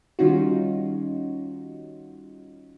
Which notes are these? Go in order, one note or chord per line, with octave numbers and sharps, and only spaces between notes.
D#3 G3 C#4 D#4 F4 F#4